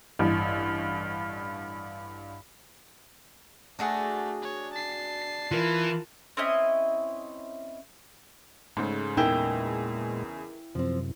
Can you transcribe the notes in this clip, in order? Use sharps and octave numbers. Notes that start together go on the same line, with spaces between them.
A1 G2
A3 D4 F#4 G#4
C#5
A5 C7
E3 F4 A#4
C4 C#4 E4 D#5
G#2 C#3 A3
E2 A#2 C#3 G#3 D#4 E4 A#4 G5
F#2 C3 F3 C4